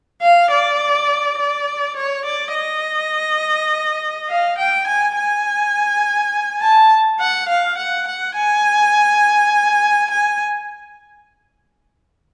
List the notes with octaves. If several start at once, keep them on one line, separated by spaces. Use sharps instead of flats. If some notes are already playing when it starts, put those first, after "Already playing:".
F5
D5
D5
C#5
D5
D#5
F5
G5
G#5
G#5
A5
F#5
F5
F#5
F#5
G#5
G#5